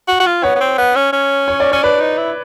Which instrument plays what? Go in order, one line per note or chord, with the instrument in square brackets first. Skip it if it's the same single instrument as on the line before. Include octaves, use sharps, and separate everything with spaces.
[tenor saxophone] F#4
F#4
F4
[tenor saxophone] B3 [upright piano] C#5
[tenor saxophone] B3
C4
B3
C#4
C#4
[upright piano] C#5
D5
[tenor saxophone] C#4 [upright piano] C#5
[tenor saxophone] D4 [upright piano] B4
[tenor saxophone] D#4
E4